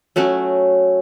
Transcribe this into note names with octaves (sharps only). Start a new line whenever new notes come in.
F#3 A3 C#4 F#4